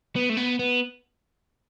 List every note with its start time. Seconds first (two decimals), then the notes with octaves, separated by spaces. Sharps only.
0.16 B3
0.29 A3
0.37 B3
0.59 B3